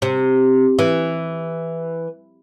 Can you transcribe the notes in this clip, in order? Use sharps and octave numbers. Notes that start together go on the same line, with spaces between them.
C3
E3